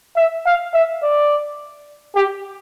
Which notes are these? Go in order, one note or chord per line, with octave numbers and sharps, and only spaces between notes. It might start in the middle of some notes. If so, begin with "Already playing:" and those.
E5
F5
E5
D5
G4